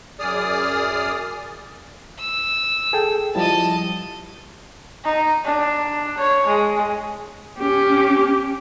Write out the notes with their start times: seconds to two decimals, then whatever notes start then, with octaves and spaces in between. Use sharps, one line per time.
0.19 F#2 G#4 D5 D#6 F6
2.20 E6
2.93 G#4 A4 G5
3.35 F3 G3 E4 D#5 A5
5.05 D#4
5.45 D4
6.19 C#5
6.48 G#3
7.59 C#4 G4